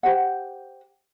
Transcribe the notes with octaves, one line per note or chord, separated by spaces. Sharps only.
G4 C5 F#5